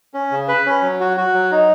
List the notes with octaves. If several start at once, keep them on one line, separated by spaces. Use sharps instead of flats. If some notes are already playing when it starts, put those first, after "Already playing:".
C#4
C#3
B4
C#4
F#3
F#4
F#4
F#3
D#4